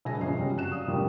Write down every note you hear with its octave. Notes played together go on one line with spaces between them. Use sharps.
E1 F#3 E5 G#5 A#6
G1 E2 C#3 F4 D#5 C7
F1 G3 G#3 C#4
F#1 F#4 F#6 E7
D5 F5 D#6
G1 C2 F2 A2 D#3 G3